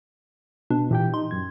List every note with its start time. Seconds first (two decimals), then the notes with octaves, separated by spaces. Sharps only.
0.70 B2 D4
0.91 A#2 E3 G4 G5
1.14 D#4 C6
1.31 F#2 G#6